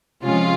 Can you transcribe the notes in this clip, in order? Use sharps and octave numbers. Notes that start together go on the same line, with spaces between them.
C3 F3 G#3 C#4 F4